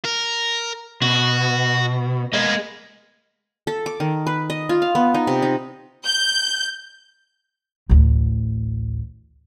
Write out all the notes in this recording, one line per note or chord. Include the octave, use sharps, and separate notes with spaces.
A#4
B2 F#4
A#3 B3 G#4 D#5
A4
D6
D#3
B4
D#5
F4
F5
B3
D#4
C3
D#4
G6
A1 D2